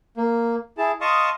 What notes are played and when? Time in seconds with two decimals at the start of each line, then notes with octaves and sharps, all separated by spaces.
0.17 A#3
0.78 E4 G#4 A5
1.01 D#5 F5 A5 C6 C#6 D#6